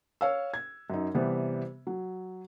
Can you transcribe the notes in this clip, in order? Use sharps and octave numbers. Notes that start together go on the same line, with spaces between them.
C#5 F5 E6
G#6
F#2 D#4
C3 E3 G3 B3
F#3